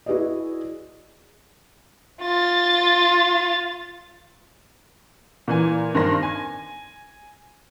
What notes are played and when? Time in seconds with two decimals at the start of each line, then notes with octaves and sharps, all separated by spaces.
0.06 E4 F#4 G#4 B4 D5 D#5
2.22 F4 A6
5.48 A#2 E3 G#5
5.95 G2 D#3 A#3 C4 C6 A#6
6.23 G#5